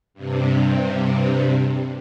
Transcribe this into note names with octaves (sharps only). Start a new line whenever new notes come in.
G2 C3